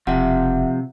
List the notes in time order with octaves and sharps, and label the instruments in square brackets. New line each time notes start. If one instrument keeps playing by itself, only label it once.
[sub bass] E1 [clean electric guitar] C3 F3 [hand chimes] E5 F#5